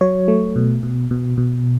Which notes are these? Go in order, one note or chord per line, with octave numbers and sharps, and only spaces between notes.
F#3 C#5
A3
B2
B2
B2
B2